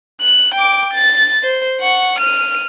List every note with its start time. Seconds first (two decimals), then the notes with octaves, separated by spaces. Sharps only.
0.21 F#6
0.54 G5 D6
0.94 A6
1.43 C5
1.81 F#5 C#6
2.19 F6 D#7